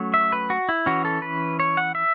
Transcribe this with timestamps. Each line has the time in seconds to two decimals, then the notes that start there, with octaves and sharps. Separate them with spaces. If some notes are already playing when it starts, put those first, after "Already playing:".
Already playing: F#3 A3 C#4
0.14 E5
0.32 B4
0.50 F#4
0.69 E4
0.86 E3 C#4 F#4
1.05 A4
1.22 B4
1.60 C#5
1.77 F#5
1.95 E5